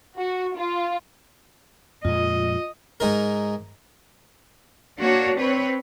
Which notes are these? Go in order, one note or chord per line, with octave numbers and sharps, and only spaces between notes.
F#4
F4
F2 A#2 G#3 F4 D#5
G#2 D#4 A#4
A#3 D4 F#4 C#5
C4 B4 C#5